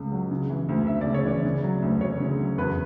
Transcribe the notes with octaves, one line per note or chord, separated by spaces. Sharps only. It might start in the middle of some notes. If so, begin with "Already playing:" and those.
Already playing: C#2 C#3
F#3
C#3
E3
D2
D2 E5
D5
C#3
C#5
E3 D5
C#3
F#3
D2
D2 C#5
C#3
F#3
E2 B4